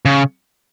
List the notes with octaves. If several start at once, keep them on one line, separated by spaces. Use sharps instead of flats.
C#3